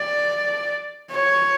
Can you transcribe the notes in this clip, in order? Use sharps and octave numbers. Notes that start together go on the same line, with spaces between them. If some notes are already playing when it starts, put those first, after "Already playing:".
Already playing: D5
C#5